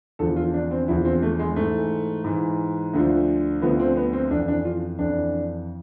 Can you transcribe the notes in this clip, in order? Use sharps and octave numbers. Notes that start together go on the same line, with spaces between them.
E2 D3 F3 A4
F4
D4
C4
E2 D3 F3 E4
C4
A3
G#3
G#2 E3 A3
G#2 E3
D2 D3 F3
D2 D3 F3 B3
C4
B3
C4
F2 E3 D4
D4
F4
F2 E3 D4